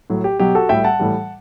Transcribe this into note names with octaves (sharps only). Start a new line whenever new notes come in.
A2 F#3
G4
B2 F#3 G4
F#4 A4
A2 G3 E5 G5
F#5 A5
A2 E3 G3